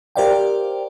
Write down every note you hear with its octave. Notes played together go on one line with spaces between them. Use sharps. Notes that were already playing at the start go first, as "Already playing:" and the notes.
G4 A#4 C5 D5 F5 G5